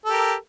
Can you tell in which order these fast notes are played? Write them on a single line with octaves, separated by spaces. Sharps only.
A4 G4 A#4